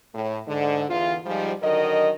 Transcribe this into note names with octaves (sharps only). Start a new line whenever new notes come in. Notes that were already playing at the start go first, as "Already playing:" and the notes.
A2
G#2 D3
E2 F4
G#2 F3 G3
D3 D#3 F#3 A#4 D#5